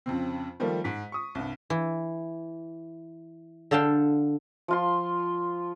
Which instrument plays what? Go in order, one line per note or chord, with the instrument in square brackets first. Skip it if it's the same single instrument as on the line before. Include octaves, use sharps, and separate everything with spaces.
[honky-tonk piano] F2 C#3 C4
D#3 F3 G3 A3 A#3
G#2 B6
C#6 D#6
C2 G2
[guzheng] E3
D3 A4 F5 G5 A5
[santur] F3 F4 C6